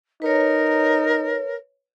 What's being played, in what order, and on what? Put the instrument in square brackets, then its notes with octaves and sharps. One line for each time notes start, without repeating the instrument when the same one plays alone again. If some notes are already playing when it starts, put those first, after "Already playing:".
[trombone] D#4 [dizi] A#4 [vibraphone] B4 C#5